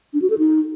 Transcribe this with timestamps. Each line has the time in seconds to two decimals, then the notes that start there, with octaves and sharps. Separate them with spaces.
0.14 D4
0.22 F#4
0.30 A4
0.38 D#4